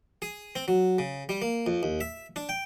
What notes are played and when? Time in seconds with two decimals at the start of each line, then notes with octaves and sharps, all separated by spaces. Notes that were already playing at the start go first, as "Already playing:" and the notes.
0.22 G#4
0.56 C4
0.68 F#3
0.99 C#3
1.29 G3
1.42 A#3
1.66 F2
1.83 D#2
2.01 E5
2.36 D4
2.49 G5